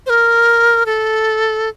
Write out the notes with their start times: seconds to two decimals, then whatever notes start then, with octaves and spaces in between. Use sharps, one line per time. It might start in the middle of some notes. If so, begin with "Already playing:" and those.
0.06 C5
0.10 A#4
0.86 A4